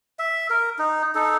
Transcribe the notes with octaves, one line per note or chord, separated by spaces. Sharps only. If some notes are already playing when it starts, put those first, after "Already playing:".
E5
A#4
D#4
D#4 A4